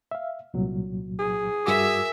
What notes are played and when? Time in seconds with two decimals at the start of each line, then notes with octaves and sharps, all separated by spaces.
0.11 E5 F5
0.54 C2 A#2 F#3
1.19 G#4
1.66 G2 F#4 A#4 E5 G#5 D6 E6